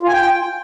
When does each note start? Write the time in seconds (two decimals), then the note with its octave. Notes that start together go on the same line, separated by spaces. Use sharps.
0.03 F4
0.08 G#5
0.13 G5